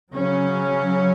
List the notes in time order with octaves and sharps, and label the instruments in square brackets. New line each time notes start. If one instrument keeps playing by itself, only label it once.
[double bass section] C#3 F#3 C#4